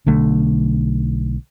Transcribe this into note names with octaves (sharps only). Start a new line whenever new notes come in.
B1 D3 A3